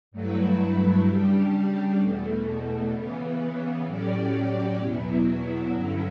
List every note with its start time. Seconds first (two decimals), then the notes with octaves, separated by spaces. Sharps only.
0.11 G2 F#3 A3 E4 B4
1.05 C#3 G3 D4 G4
1.99 E2 B2 A3
2.92 C#3 E3 B3
3.85 A2 F#3 C#4 G4 D5
4.79 E2 B2 F#3 B3 E4
5.72 G2 D3 F#3 C#4 E4